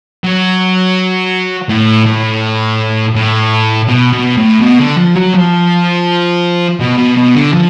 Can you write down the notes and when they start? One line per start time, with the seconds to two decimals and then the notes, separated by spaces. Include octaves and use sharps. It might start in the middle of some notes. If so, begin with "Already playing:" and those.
0.24 F#3
1.69 A2
2.06 A2
3.15 A2
3.88 B2
4.13 B2
4.37 A2
4.61 B2
4.80 D3
4.98 F3
5.16 F#3
5.35 F3
6.80 B2
6.98 B2
7.17 B2
7.35 D3
7.53 F3